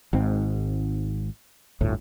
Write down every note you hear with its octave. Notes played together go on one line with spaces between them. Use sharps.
G#1 G#2 C4
G1 D2 A2